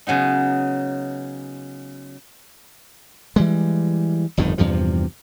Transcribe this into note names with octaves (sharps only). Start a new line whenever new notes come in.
C#3 F#3 B3 D#4
E3 G3 G#3
G1 F2 A2 D#3
E2 G2 C3 F3